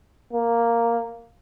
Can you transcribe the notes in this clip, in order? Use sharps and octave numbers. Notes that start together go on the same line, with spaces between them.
A#3